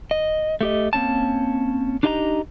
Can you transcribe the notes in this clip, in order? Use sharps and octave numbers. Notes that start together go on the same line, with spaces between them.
D#5
A3 G4 D#5
A#3 C4 C#4 A5
D4 D#4 G4 D#5 A5 A#5